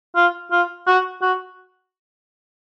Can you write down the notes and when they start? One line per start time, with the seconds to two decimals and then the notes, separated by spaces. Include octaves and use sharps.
0.16 F4
0.51 F4
0.87 F#4
1.22 F#4